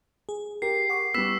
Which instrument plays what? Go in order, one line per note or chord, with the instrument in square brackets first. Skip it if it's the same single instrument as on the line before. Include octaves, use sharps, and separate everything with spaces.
[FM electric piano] G#4
[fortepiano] G4 [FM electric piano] A#4 [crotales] C7
[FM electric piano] F#5 C#6 D6
[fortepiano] G3 B3 [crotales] E6 B6 E7